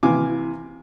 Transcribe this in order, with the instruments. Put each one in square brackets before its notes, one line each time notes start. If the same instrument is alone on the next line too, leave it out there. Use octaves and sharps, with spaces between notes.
[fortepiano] C3 E3 F5 G#5 D6